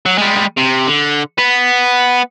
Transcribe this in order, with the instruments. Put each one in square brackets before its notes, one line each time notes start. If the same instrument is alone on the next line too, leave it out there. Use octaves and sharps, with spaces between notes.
[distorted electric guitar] F#3
G3 G#3
C3
D3
B3